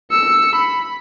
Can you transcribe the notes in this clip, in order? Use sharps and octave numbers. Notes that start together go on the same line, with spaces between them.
E6 C#7
B5